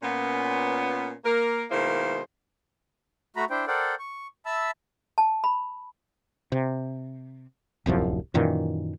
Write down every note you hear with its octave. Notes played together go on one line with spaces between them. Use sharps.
A#2 B3 C#4
A#3 A#4
B2 D#3 G#3 A#3 E4 C5
A3 F#4 A#5 B5
D4 E4 C5 G5
A4 A#4 C5 D5 F#5 G5
C#6
E5 A5 B5 E6
A5
B5
C3
D1 C2 F#2 F3
F#2 A#2 D#3 E3